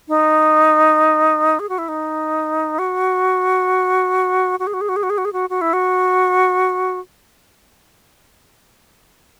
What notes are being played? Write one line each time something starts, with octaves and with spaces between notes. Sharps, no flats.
D#4
G#4
F#4
E4
D#4
F#4
F#4
G#4
F#4
G#4
F#4
G#4
F#4
G#4
F#4
G#4
F#4
F#4
E4
F#4